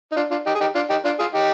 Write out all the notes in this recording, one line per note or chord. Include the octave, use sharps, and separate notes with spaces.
D#4
D4 F4
D4 F4
D#4 G4
G#4
D#4 G4
D4 F4
D#4 G4
D4 F4
F4 G#4
D#4 G4